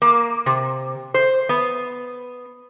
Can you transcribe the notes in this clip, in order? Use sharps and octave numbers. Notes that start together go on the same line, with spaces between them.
A#3
C3
C5
B3